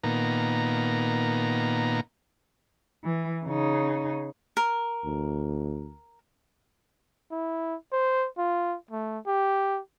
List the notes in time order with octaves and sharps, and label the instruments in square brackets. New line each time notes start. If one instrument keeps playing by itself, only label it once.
[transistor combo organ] A#2 D#3 B3 A#5
[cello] E3
C#3 D#4
[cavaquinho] A#4
[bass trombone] D2
[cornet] E4
C5
F4
A3
G4